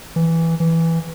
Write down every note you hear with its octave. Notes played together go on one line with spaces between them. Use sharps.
E3
E3